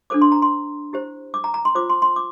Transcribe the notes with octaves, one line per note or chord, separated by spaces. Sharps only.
D4 A4 C5 D6
C6
A#5
C6
E4 G4 C5
D6
A#5
A#5
C6
F4 C5 D6
C6
C6
D6